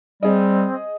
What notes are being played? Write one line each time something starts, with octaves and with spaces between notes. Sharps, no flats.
G3 C4 G#4 D#5